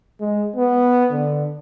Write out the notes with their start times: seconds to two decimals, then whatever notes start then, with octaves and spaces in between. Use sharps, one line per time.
0.20 G#3
0.56 B3
1.11 D3